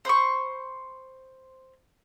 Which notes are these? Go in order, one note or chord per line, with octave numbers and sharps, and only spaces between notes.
C5 B5 C#6